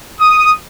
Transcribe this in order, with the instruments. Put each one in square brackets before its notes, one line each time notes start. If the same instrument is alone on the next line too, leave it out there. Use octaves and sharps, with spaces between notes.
[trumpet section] D#6